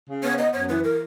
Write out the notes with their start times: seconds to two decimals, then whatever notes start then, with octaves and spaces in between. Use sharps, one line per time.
0.08 C#3
0.23 B3 C#5
0.39 B3 D#5
0.53 F#2 C#5
0.69 E3 B4
0.84 A#4